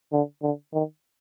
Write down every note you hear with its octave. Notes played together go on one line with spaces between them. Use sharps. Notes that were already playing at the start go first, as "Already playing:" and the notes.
D3
D3
D#3